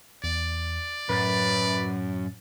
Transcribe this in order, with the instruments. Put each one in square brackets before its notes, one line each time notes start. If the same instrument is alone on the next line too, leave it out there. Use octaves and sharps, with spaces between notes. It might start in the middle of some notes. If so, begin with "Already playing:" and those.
[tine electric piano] E2 [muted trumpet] D5
[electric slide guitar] F#2 [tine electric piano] A2 A6 [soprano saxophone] B4